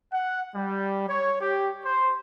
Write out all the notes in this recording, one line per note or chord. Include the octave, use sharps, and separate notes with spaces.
F#5
G3
C#5
G4
C5